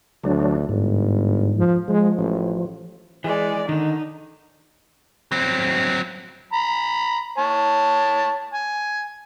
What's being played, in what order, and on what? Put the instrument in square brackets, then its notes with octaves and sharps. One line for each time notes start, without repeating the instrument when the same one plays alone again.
[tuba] D2 [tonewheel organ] F#3 D4
[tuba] G1 [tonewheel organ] G#2
[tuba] F3
[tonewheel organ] F3 [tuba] G#3
[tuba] A1
[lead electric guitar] E3 [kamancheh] G#3 D5
[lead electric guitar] D3 D#3 [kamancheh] D#4
[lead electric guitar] F#3 C4
[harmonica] A#5 B5
C#5 A5
G#5